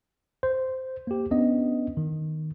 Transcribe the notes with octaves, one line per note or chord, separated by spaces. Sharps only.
C5
A#3 G4
B3 C#4 D4 D#5
D#3